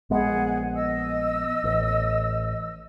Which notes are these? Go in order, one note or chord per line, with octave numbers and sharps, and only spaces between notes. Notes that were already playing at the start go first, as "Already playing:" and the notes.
A#1 G#3 B3 G#4 F#5
D#5 E6
A1